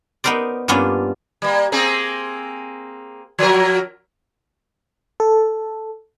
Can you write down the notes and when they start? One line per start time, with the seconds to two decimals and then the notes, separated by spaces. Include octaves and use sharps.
0.24 B3 D#4 A#4 C5 D5
0.68 G2 A#3 B3 C#4 D4 F4
1.42 G3 A#3
1.72 A#3 C4 G#4
3.39 F3 F#3 A#4
5.20 A4